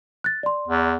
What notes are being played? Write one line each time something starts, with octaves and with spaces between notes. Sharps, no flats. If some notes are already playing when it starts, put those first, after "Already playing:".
F#6 A6
D5 C6
E2